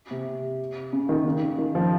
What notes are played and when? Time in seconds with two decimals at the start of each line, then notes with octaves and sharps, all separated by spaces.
0.11 C3
0.93 C#3
1.09 D#3
1.25 C#3
1.58 D#3
1.75 F3